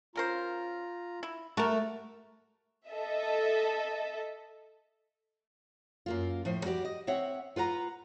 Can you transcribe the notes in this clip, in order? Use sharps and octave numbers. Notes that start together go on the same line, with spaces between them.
C#3 F4 A#4 C5 A#5
E4
A3 F#4 A#4
A4 D#5 E5
F#2 A#3 F4
A2 F3 C5
G3 F#4 G4 D5
D#5
C4 C#5 E5 F#5
F4 B4 F#5 A#5